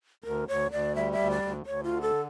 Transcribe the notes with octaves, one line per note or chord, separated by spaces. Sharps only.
D2 A#4
D2 C#5
D2 D5
G3 E5
E5
D2
D5
D2
D2 C#5
F4
D3
A4